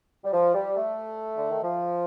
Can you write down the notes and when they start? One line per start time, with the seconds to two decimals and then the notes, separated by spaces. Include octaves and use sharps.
0.24 G3
0.33 F3
0.55 G3
0.76 A3
1.36 D3
1.50 D#3
1.63 F3